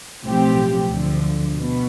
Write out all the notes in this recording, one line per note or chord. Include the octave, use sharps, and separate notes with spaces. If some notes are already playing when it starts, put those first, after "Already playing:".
B1 A2 F3 C4 G4
D2 D3 F3
B2